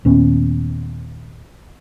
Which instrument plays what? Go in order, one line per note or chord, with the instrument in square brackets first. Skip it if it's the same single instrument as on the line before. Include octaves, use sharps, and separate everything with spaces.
[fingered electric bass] D#1 D#2 B3 C#4